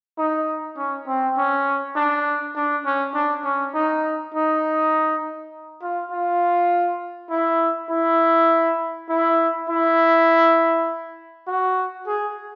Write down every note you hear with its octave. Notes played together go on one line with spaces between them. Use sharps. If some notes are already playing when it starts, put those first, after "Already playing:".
D#4
C#4
C4
C#4
D4
D4
C#4
D4
C#4
D#4
D#4
F4
F4
E4
E4
E4
E4
F#4
G#4